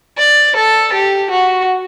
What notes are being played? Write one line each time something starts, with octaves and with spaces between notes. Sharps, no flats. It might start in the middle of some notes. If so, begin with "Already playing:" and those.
D5
A4
G4
F#4